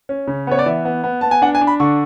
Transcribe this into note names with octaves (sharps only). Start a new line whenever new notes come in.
C#4
C#3
B3 C#5
D5
E3 E5
B3
B3
B3 A5
G#5
D4 F#5
G#5
D4
B5
D3 C#6